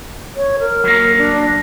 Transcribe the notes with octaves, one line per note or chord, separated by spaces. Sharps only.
C#5
A#4
F#3 A#3
D4